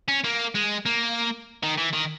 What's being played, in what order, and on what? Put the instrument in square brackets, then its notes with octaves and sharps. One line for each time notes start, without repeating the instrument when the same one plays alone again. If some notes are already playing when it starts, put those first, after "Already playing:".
[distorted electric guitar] C#4
A#3
G#3
A#3
D#3
E3
D#3